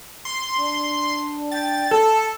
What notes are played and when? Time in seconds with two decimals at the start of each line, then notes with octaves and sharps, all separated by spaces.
0.25 C6
0.59 D4
1.52 G5 A6
1.91 A4 A5